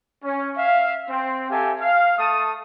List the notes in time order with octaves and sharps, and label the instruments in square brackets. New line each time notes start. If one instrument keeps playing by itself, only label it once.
[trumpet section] C#4
E5 F5
C4
G4 A4 E5 F5 G#5
F5
A3 A5 D#6